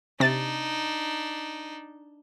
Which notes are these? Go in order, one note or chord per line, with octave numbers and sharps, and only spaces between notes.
C3 D4 D#4 A6